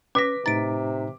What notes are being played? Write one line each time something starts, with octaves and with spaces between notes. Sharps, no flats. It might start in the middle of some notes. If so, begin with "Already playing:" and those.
C#4 B4 D6 A#6 B6
A2 C3 D#4 A#5 A6 D7